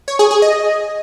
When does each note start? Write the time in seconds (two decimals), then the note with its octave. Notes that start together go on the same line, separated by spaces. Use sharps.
0.08 C#5
0.19 G#4
0.31 G#4
0.42 D#5